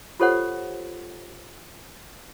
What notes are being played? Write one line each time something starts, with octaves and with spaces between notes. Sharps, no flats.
F4 G4 A4 C5 C#5 F#5